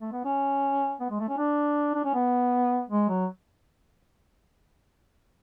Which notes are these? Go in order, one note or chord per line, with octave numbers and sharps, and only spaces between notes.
A3
B3
C#4
B3
G#3
A3
C#4
D4
D4
C#4
B3
G#3
F#3